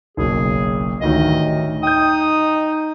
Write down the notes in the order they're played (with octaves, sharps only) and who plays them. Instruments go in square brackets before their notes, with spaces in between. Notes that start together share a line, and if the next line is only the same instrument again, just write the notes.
[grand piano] F#1 B1 [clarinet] G#4
[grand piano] A1 D2 D#3 [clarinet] D#5
[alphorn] D#4 [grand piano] G5 G6 [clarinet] D#6